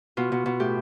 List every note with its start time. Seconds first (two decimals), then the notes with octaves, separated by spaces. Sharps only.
0.17 B2 F4
0.32 B2
0.46 B2
0.60 A2 G4